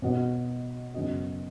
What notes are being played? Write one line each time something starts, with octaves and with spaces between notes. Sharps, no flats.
B2 B3 F#4 D#5
F#2 C#3 B3 F#4 D#5